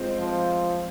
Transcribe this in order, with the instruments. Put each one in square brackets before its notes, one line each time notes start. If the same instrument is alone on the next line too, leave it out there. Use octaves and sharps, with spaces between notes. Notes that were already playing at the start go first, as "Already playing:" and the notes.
Already playing: [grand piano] G#3 C4 F4 C5
[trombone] F3